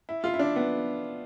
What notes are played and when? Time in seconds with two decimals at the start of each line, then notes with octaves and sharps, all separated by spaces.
0.09 E4
0.24 F4
0.34 E4
0.39 D4
0.56 B3